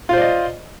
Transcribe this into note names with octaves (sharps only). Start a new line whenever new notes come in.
F4 C5 D5 D#5